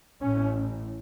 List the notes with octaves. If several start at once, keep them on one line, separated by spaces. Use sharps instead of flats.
A1 A2 C#4